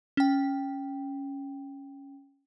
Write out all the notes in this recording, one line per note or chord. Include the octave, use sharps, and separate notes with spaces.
C#4 G5